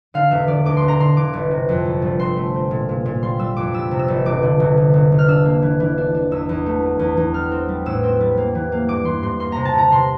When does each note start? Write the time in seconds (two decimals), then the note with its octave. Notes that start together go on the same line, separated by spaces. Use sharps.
0.14 D3 F5
0.31 E1 E5
0.47 E1 D5
0.65 D2 D6
0.77 C6
0.82 E1
0.88 A#5
1.00 D3 C6
1.17 E3 D6
1.33 G1
1.51 C3
1.69 F2
1.85 G1
2.02 G1
2.19 C4 C6
2.37 A3
2.54 C4
2.71 A#2
2.89 A#2
3.06 A#2
3.23 G3 C6
3.39 G3 E6
3.57 F2 D6
3.74 G3 E6
3.91 C3
3.99 E6
4.08 G1
4.26 E1 D6
4.43 D3
4.60 E1
4.77 E1
4.94 E1
5.12 E1
5.19 F6
5.28 D4 E6
5.45 A#3
5.62 E3
5.80 E3
5.98 D4
6.14 D4
6.31 E2 E6
6.49 E2
6.66 A3
6.83 A3
6.99 E2
7.17 E2
7.34 G3 F6
7.51 C4
7.68 G3
7.86 A1 E6
8.03 C4
8.21 G3
8.37 A#3
8.55 E3
8.72 A#3
8.88 G2 D6
9.05 E3 C6
9.23 G2 C6
9.40 A#3 C6
9.52 C3 A#5
9.65 A5
9.74 C3 A#5
9.91 C3 C6